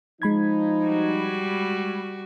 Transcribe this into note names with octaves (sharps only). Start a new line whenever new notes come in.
F3 G#3 D#4 B5 G#6
G3 F#4